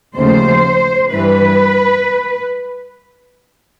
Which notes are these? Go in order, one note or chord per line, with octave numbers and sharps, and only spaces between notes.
D#2 C#3 F3 A3 C5
G2 E3 G3 B4